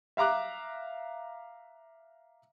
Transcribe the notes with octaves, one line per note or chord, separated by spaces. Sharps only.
E5 F5 A#5 D6 F#6